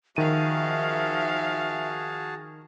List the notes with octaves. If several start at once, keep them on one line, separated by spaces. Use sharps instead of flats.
D#3 F3 F#4 G#4 E5 F5 A5 D#7